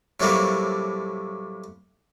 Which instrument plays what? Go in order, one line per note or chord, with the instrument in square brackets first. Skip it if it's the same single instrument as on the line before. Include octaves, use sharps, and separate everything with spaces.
[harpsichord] A2 C3 F#3 G3 A3 A#3